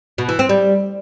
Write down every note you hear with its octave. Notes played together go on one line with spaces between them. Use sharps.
B2
E3
C4
G3